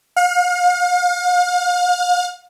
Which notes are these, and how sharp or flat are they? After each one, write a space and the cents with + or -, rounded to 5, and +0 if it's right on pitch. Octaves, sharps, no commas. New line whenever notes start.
F5 +40